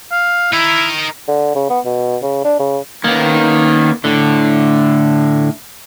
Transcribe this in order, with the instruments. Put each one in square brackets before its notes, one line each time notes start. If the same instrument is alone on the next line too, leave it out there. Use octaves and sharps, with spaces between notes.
[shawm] F5
[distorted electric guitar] D#4 A#4 [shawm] E4
[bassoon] D3
C#3
B3
B2
C#3
D4
C#3
[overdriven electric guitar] D#3 [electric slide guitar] A#3 B3 C#4
[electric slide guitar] A2 [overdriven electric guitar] D3